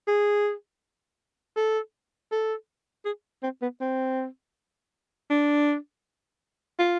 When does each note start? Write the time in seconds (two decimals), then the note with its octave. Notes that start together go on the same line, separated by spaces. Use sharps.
0.08 G#4
1.57 A4
2.32 A4
3.05 G#4
3.43 C4
3.62 B3
3.81 C4
5.30 D4
6.79 F4